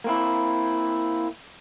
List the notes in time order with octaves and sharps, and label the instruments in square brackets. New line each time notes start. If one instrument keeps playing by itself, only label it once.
[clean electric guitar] A#3 C4 E4